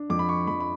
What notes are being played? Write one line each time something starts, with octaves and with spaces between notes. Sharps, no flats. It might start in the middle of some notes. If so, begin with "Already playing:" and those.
Already playing: D4
F2 D6
B5
C#6
F2 B5
B5